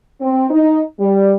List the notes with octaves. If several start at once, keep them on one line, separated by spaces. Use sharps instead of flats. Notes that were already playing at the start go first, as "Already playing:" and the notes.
C4
D#4
G3